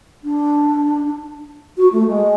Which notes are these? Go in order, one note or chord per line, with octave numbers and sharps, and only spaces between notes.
D4
F#4
A3
G#3